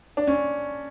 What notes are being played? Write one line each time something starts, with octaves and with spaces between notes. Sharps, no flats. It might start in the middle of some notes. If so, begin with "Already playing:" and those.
D4
C#4